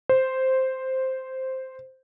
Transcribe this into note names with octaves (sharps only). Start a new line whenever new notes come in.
C5